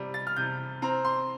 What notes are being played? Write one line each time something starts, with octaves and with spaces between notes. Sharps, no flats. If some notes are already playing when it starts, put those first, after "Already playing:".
Already playing: C3 G3
A6
F6
C3 G6
C4 A#5
C6